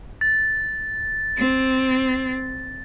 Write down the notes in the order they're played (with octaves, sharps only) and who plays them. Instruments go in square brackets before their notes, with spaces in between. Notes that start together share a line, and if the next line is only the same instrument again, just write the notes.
[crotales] A6
[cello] C4